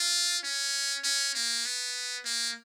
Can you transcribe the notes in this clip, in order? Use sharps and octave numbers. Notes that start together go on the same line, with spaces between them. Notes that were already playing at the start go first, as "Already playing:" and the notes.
Already playing: F4
C#4
C#4
A#3
B3
A#3